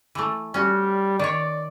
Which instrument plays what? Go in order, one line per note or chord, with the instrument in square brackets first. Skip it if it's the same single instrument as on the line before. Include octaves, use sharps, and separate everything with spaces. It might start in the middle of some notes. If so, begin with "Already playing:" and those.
[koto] E3 A3
[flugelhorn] G3 [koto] C#4 F#4
[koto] D#3 C#5 [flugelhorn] D5